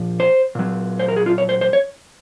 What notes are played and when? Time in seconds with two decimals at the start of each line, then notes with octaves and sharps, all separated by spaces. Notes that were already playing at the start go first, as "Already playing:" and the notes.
Already playing: A#2 F3
0.20 C5
0.55 A#2 F#3
0.99 C5
1.08 A#4
1.16 G#4
1.26 F4
1.38 C#5
1.49 C5
1.61 C5
1.73 C#5